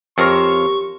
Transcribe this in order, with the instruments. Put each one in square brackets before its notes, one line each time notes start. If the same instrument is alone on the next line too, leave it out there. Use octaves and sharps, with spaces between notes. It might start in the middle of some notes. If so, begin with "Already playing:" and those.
[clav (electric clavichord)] F2 [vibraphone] G4 [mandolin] A#4 C5 C#5 [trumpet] C#6